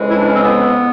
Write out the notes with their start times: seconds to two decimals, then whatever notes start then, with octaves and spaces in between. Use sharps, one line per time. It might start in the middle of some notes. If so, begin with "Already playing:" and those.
Already playing: F2 C#3 E3 G#3
0.09 E4
0.17 D4
0.25 C#4
0.33 C4
0.41 B3